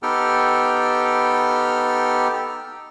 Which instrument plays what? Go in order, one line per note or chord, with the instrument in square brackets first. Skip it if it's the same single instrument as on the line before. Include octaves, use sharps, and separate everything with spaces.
[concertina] B3 D#4 G4 A4 G5 F6